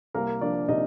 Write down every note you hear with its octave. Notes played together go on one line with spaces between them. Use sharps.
C2 A#3 A#4
F3 D4 D5
C3 D#4 D#5